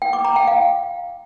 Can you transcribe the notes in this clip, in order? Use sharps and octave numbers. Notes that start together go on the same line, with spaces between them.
G5
D6
A#5
G5
F5